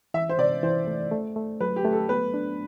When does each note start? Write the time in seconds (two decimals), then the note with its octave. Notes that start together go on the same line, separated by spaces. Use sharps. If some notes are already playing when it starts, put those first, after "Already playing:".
0.14 E3 E5
0.29 C5
0.39 C3 D5
0.63 E3 C5
0.87 A3
1.11 A3
1.36 A3
1.60 F#3 B4
1.76 G4
1.85 A3
1.93 A4
2.09 B3 B4
2.34 D4